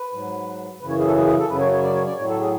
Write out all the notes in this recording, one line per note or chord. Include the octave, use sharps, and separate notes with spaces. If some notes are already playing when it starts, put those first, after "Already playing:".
Already playing: B4
G#2 F#3
F#2 C#3 E3 B4
C#5
G#4
A4
G#4
G#4
A4
F#2 C#3 F#3 B4
C#5
C#5
D5
C#5
D5
A2 F#3 C#5
A4
G#4